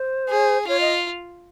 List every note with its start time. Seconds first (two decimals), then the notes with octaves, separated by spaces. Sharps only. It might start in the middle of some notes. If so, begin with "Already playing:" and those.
Already playing: C5
0.29 G#4
0.67 F4 C#5
0.80 D#5